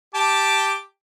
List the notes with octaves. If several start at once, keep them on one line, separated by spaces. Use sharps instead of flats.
G4 A5 D6